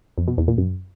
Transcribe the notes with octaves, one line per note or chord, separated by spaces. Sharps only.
F2
B2
E2
A#2
F#2